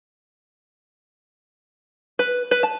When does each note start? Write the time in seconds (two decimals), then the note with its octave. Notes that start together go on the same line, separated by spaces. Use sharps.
2.19 B4
2.51 B4
2.63 A5